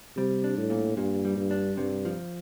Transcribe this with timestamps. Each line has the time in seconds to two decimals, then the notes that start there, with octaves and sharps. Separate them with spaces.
0.17 C3 G3
0.44 D4
0.57 A2
0.70 A#2
0.97 G2 A#2
1.25 G3
1.37 G2
1.51 D4
1.77 G2 C3
2.05 F3